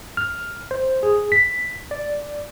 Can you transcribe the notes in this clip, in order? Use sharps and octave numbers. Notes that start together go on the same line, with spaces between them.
F6
C5
G#4
B6
D5